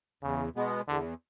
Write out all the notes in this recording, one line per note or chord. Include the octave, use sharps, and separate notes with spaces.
E2 C#3
B2 G#3 B3
E2 D3